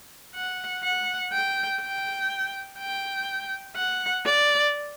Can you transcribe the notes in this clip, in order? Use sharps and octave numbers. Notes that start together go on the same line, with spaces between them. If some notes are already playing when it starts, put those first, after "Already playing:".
F#5
F#5
G5
G5
G5
F#5
D5